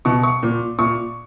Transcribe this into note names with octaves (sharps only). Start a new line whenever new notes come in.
B2 C#6
C#6
A#2
A#2 C#6